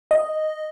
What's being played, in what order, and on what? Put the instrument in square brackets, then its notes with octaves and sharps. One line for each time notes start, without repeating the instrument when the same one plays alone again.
[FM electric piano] D#5